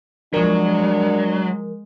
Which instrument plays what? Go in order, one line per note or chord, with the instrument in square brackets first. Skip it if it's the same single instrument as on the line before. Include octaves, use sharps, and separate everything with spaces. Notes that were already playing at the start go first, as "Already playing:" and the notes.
[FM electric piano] F3 A#4 [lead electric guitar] F#3 [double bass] G#3 [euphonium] D4